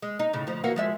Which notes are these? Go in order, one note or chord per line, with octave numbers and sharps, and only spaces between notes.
G#3
D#4
A2 C#3
D2 F3
E3 A#3 F#4
F3 G#3 E5